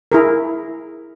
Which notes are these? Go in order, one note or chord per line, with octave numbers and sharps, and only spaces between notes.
E4 G#4 A#4